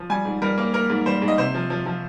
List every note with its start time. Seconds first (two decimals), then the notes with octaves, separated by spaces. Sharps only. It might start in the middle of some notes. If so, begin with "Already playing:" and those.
Already playing: F3
0.10 G3 G#5
0.25 G#2
0.42 G3 A#4
0.58 A#3
0.74 A#3 A#4
0.90 G#2
1.06 G3 C5
1.22 G#2
1.28 D#5
1.38 C3 C5
1.55 F3
1.70 F3
1.86 F3